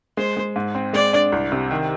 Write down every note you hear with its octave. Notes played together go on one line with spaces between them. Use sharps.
G#3 C5
G#3
G#2
C4
G#3 D5
D4
C2
C3
D#3